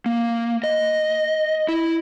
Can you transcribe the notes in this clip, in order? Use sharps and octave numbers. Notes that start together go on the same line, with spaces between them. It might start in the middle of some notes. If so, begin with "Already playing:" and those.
A#3
D#5
E4